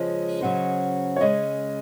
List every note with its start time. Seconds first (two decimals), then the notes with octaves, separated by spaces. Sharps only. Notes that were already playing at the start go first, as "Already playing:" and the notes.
Already playing: C#3 F3 G#3 C#4 D#5
0.41 C#3 F#3 C#4 F#4 C5
1.16 C#5
1.21 C#3 G#3 C#4 D#5